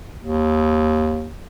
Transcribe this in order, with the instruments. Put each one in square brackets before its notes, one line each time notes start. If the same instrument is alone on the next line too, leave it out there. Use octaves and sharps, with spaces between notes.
[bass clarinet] D#2